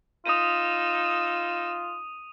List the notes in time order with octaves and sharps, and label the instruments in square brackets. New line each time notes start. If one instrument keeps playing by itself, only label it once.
[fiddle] D#4 E6 [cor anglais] F4 [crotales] D#6 D#7